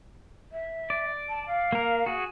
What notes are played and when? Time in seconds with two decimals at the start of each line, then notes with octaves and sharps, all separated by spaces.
0.52 E5
0.90 D5
1.29 A5
1.47 F5
1.73 A#3 A#4
2.06 F#4 G#4